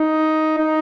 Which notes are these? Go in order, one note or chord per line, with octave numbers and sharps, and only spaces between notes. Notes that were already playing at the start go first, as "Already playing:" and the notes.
Already playing: D#4
D#4